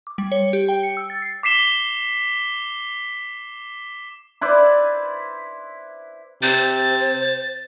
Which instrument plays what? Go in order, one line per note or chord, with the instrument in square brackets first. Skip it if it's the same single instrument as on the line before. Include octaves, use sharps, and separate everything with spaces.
[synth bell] D6
G3
C#5
G4
G5
C#7
E6
A6
C7
[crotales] D6 B6 C7 E7 G7
[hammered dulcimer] E4 B4 C5 D5
[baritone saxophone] C3 [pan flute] C5 [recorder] A6